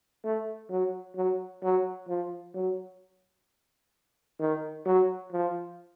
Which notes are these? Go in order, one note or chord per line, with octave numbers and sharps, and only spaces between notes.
A3
F#3
F#3
F#3
F3
F#3
D#3
F#3
F3